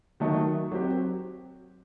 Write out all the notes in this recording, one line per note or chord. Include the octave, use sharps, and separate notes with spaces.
D#3 F#3 A3 D#4
F#3 C4 G4